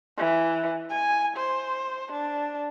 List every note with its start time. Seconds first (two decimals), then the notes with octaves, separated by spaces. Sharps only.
0.17 E3
0.90 G#5
1.36 C5
2.12 D4